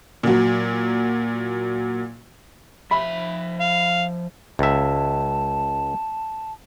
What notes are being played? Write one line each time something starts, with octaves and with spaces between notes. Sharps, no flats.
A#2 F#3
F3 E5 B5
F5
C#2 E5 A5